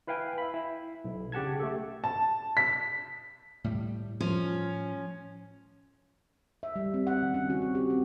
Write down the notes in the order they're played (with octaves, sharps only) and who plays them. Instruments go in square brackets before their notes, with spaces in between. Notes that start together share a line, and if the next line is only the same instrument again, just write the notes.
[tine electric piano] E4 B4 F5 G5 G#5
E5 B5
E4
B1
C#3 G4 F#5 A5 G#6
A3 G4 A4
[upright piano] A5
B6
[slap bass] A2 G3
[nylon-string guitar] F3 [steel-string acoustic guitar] C#4
[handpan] E5
G3
C4
F#5
D#3
C#4
F#4
C4
G4
C4